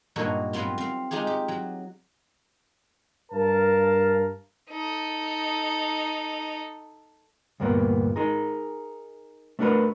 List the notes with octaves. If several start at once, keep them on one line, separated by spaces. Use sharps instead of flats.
G2 A#2 A#3 D#4 F#4 C#5
F#3 B3 C4 F4
C4 F5
G#3 D#4 F4 G4 G#4
G4
F#3
G2 A#4 F5 A5
D#4 A4
D2 G2 A#2 A#3 B3
D#4 G#4 A#4
A3 B3 D4 F#4 A#4 B4